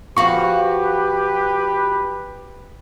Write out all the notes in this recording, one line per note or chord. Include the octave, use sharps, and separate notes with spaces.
F3 F#4 G4 B4 F5 C#6